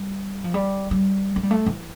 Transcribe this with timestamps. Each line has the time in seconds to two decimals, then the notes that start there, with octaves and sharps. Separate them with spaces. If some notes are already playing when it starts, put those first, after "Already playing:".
Already playing: G3
0.44 F3
0.54 G3
0.91 G3
1.36 A3
1.43 G3
1.51 A3
1.66 E3